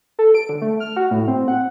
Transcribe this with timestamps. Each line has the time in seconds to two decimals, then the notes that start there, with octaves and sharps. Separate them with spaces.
0.19 A4
0.34 D7
0.49 D3
0.61 A3
0.80 F6
0.96 F#4
1.11 A2
1.28 C4
1.48 F#5